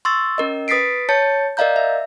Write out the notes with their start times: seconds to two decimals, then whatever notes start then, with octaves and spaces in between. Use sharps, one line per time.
0.05 C6 C#6 E6 A6
0.38 C#4 A#4 D#5
0.68 B4 D#6 A6 B6 C7 D7
1.09 C#5 A5 G6 A6 C#7
1.57 A#4 D5 D#5 F5 A#5 G6
1.76 E5